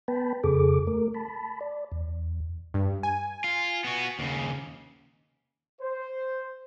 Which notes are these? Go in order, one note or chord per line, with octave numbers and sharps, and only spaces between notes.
B3 B4 G5 A5 B5
F2 C#3 G#4 A4 D6
A3 A#4
A5 B5
D5
E2
G2
G#5
F4
B3 F#4
D#2 C#3
C5